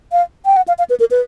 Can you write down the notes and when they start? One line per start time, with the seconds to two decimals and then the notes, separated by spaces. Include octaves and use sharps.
0.12 F5
0.46 G5
0.57 F#5
0.68 F5
0.78 F5
0.90 B4
1.00 A#4
1.11 B4